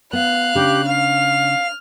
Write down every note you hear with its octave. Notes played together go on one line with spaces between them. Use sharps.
B3 F5 F#6
C#3 D4 G4
F5 F6